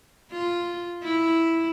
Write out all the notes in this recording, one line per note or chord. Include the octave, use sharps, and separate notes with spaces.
F4
E4